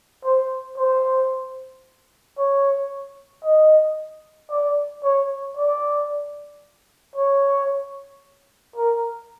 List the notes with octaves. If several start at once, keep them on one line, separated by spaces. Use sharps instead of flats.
C5
C5
C#5
D#5
D5
C#5
D5
C#5
A#4